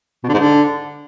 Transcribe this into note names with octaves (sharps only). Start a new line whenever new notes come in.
B2
D3
G#2
D3